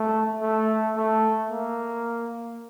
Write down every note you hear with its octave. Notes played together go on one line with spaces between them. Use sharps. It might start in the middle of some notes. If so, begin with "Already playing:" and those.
Already playing: A3
A3
A3
A#3